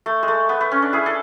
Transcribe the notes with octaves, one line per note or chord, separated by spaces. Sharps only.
A3
G#3
A3
B3
B3
C#4
D4
E4 G#4
A4